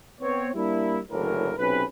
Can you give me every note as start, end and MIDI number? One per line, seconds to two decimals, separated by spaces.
0.21 0.49 59
0.21 0.49 60
0.21 0.49 73
0.55 1.00 55
0.55 1.00 58
0.55 1.00 62
0.55 1.00 64
1.11 1.52 30
1.11 1.52 45
1.11 1.52 50
1.11 1.52 52
1.11 1.52 54
1.11 1.52 70
1.58 1.83 35
1.58 1.83 48
1.58 1.83 61
1.58 1.83 71